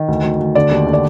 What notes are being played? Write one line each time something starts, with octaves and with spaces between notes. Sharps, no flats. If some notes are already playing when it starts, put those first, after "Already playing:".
Already playing: D#3
D2
D2
D2
D3 D5
D#2
D3
D5